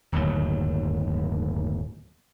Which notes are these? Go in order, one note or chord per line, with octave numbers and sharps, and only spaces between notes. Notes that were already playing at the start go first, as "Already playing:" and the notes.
D1 G1 D#2 F#3